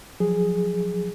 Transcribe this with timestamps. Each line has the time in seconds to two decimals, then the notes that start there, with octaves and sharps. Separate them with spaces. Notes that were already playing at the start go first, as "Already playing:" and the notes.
0.20 F3 F#3 G#4